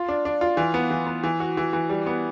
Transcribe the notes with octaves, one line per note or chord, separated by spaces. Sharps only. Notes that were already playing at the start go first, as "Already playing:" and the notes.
Already playing: F4
D4
D4
F4
E3
B3
E3
B3
E3
F#4
E3
E3
G3
B3